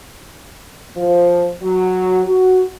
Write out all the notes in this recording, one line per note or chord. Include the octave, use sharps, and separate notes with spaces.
F3
F#3
F#4